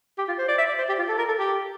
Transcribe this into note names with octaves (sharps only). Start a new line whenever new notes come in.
G4
F4
C5
D5
E5
D5
C5
G4
F4
A4
A#4
A4
G4